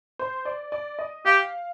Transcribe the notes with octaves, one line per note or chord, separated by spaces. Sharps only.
C5
D5
D5
D#5
G4 F5